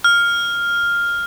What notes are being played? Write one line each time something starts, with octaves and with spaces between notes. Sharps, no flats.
F6